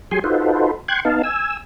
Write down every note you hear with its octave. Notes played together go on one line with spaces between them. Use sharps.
F#3 G4 G#4 G#5 C6
D#4 F4 F#4 A4 B4 C5
G5 C6 C#6 F#6 G#6
B3 D#4 F5 A5
G#5 E6